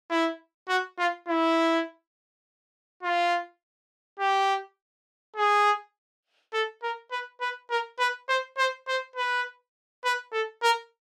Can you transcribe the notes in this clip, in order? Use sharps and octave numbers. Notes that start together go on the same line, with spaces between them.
E4
F#4
F4
E4
F4
G4
G#4
A4
A#4
B4
B4
A#4
B4
C5
C5
C5
B4
B4
A4
A#4